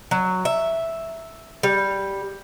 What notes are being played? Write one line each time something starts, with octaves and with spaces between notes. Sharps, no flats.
F#3
E5
G3